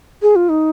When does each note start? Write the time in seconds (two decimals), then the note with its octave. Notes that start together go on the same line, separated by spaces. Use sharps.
0.22 G#4
0.36 F4
0.49 D#4